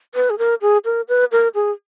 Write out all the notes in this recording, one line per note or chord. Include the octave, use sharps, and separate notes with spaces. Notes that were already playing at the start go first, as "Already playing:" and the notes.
B4
G#4
A#4
G#4
A#4
B4
A#4
G#4